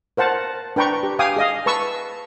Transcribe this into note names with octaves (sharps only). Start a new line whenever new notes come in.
A#4 C5 F#5 A5
D4 B4 G5 A#5 C#6
G4
F5 G5 G#5 D6 D#6
G#4 D#5 F5
B4 A5 C#6 E6